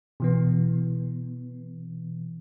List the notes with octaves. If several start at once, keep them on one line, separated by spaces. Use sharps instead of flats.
B2 E3 B3